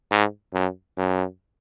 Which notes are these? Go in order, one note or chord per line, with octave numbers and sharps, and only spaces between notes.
G#2
F#2
F#2